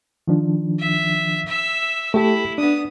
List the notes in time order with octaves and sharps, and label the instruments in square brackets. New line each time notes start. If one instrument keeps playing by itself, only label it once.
[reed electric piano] D#3 F3 D4
[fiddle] E5
E5 E6
[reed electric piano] A3 G4 A4 [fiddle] E4
[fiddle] B3 D#6 [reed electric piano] D4